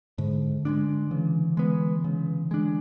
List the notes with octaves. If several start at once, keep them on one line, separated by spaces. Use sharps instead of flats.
G#2 D3
G#3 B3 D4
C#3 E3
G#3 B3
C#3
G#3 D4